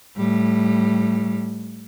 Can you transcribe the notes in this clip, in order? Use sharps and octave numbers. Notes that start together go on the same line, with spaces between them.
A2 G3